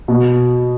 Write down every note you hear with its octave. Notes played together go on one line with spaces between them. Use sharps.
B2